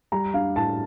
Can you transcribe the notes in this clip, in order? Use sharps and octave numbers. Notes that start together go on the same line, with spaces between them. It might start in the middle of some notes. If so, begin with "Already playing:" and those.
G3 A#5
D4 F5
A2 A5